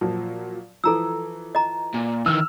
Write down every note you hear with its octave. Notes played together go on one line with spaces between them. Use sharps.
A#2 F3 F#3
E3 F3 A4 A#5 E6
D#5 A#5
A#2
D#3 E3 E6 F6